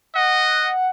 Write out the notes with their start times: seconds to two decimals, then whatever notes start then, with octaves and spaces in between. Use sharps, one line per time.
0.15 D#5 F#5